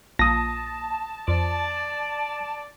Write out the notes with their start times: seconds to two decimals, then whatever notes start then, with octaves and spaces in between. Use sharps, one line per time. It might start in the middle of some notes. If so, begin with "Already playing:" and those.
0.19 A#1 A5 D#6 A#6
1.28 F2 D5